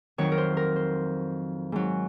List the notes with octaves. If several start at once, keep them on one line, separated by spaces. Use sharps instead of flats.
F2 D#3 F#3 C#5
A#4
C5
A#4
C5
G#2 F#3